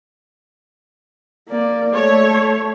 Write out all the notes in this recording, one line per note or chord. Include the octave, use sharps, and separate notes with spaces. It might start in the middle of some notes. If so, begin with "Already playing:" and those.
A#3 D5
A3 C#5